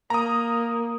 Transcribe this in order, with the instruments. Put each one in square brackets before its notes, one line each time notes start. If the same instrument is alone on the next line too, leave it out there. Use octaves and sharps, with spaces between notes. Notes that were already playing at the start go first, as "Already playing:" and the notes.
[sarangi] A#3 [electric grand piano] A#5 D#6